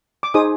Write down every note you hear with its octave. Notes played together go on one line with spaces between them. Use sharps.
D6
D#4 G#4 C5 D#6